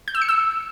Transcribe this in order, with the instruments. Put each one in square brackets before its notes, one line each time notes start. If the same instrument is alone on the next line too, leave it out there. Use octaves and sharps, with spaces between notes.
[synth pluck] G6
E6
C#7
E6